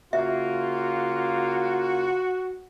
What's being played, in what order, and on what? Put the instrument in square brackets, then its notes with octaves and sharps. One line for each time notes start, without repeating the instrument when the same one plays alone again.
[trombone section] C#3 A#3 F4 [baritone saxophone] F#4 [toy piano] E5